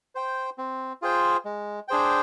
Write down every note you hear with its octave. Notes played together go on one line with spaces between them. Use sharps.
C5 G5
C4
F4 G#4 C5 G5
G#3
D4 G#4 C5 G5